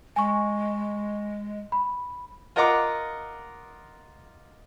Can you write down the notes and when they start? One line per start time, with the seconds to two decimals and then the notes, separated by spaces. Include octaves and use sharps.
0.16 G#3 G#5 C#6
1.72 B5
2.56 F4 A#4 D#5 F#5 A#5 D6